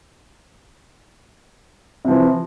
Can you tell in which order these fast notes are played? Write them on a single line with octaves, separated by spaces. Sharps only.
C3 F3 E3